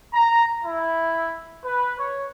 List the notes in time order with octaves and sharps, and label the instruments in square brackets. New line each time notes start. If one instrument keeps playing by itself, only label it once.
[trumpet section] A#5
E4
B4
C#5